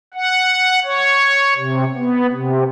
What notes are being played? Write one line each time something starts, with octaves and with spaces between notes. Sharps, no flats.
F#5
C#5
C3
B3
C3